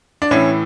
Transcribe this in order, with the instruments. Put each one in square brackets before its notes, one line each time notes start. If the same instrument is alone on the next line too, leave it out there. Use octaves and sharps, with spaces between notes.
[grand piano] D4
A2 E3 C#4